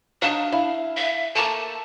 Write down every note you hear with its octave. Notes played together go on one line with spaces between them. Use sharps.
F#3 D4 D#4 F5
E4 F5
E5
A3 A#3 A4 A5